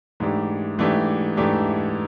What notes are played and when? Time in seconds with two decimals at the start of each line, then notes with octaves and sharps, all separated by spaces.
0.20 G#2 E3 A3 D4 G4
0.78 G#2 E3 A3 D4 G4
1.37 G#2 E3 A3 D4 G4